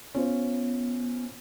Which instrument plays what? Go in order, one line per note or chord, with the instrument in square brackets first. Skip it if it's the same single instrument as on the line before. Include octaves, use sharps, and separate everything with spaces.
[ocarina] B3 [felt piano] C#4 F4 C5